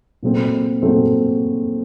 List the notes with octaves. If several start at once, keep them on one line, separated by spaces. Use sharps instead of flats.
A#2 F#3 A3 C4
A#2 F#3 A3 C4